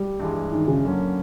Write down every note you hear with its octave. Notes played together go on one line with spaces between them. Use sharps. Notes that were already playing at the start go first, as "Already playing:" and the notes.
Already playing: G3
G2 E3 G#3
D#3
C#3
F#2 D3 F#3 A#3 C#4